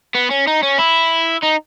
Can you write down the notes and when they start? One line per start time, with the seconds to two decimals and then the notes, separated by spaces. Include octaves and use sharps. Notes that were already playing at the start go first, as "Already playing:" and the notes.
0.15 B3
0.31 C#4
0.48 D#4
0.63 C#4
0.79 E4
1.43 D#4